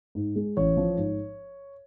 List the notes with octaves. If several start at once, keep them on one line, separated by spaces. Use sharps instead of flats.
G#2
G#3
A1 C#5
F3
G#2